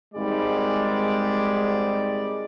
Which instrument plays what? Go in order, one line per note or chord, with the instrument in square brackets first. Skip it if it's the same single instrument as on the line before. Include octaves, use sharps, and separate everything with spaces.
[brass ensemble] G#1 G#2 G3 G#3 D5